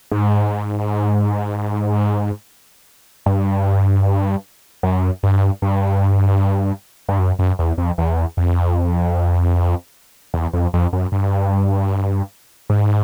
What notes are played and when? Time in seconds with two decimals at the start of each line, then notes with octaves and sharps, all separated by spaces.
0.11 G#2
3.26 G2
4.83 F#2
5.23 G2
5.62 G2
7.09 G2
7.19 F#2
7.39 F#2
7.59 E2
7.78 F2
7.98 E2
8.37 F2
10.34 E2
10.53 F2
10.74 F2
10.93 F#2
11.12 G2
12.70 G#2